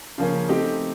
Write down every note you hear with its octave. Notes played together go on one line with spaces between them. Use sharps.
C#3 F3 A#3 C#4
A3 C4 D#4 G4